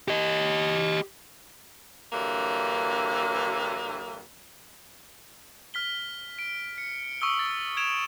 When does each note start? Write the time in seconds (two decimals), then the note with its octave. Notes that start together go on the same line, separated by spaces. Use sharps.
0.08 G4 D#5
2.13 G2 D3 E3 F#3 A#3
5.74 F6 B6 G7
6.39 D7
6.78 C#7
7.21 C#6 D#6 E6 G7
7.39 A6
7.77 G#6 D7 E7 F7